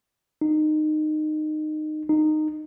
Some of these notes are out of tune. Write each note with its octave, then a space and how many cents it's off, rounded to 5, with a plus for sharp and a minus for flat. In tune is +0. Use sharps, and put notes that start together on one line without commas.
D#4 -20
D#4 -15